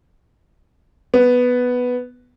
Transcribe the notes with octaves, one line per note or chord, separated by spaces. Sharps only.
B3